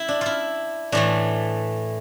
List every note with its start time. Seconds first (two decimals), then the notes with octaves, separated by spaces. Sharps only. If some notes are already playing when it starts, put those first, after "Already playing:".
Already playing: E4
0.08 D4
0.21 E4 F4
0.92 A2 E3 A3 D4